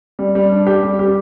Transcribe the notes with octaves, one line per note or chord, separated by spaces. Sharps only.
G3
G3
D4
G4
G3
G4